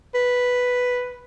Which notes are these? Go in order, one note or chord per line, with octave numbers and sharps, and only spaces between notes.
B4